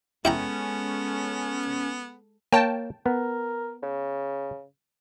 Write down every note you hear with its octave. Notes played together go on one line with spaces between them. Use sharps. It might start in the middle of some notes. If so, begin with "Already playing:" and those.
G#3 B3 C#4 E4 A4 G5 A#5
A#3 C#5 G5 A5
B3 A#4
C#3